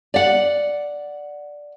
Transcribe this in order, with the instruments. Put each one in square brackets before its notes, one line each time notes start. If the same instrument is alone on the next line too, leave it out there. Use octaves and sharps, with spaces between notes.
[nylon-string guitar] D5 F#5